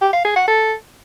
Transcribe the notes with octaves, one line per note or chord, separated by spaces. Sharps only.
G4
F5
G#4
F#5
A4